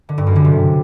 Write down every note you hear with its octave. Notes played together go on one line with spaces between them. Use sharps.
D3
G2
F#2
D3
C3